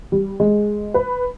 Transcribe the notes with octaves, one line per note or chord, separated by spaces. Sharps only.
G3
G#3
B4